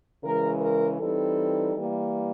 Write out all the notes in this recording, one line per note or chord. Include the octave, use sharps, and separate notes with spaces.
C#3 E3 G#3 A#4
A#4
E3 G3 C4 D#4 A4
E3 G3 A#3